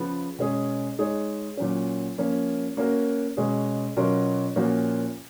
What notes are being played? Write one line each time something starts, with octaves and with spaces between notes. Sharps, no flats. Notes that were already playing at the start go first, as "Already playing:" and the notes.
Already playing: C#3 F3 B3
B2 G#3 C#4 G#4
G#3 D#4 G#4 C#5
A#2 F#3 C#4
F3 A#3 C#4
A#3 C#4 F#4 A#4
B2 G#3 C#4 G#4
B2 F#3 C#4 F4 A#4
A#2 F3 A#3 C#4 F#4